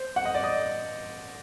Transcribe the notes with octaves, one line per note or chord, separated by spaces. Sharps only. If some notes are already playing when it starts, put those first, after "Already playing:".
Already playing: C5
F#5
D#5
D5
D#5